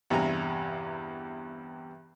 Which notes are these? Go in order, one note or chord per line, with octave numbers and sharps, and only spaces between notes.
E2 G2 C3 G#5 A#5